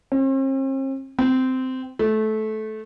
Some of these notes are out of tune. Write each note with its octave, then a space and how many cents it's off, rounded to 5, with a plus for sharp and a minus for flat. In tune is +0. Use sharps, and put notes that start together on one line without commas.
C4 +45
C4 -15
A3 -20